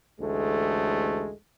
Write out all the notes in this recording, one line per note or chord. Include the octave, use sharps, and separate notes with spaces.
A1 D2 G#3 A3